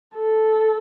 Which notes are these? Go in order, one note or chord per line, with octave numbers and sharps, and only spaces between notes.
A4